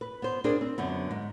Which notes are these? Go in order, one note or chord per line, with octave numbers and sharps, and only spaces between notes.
B4
B3 C5
C4 D4 G#4 A#4 C5
C4
F#2 D3 B3
G#2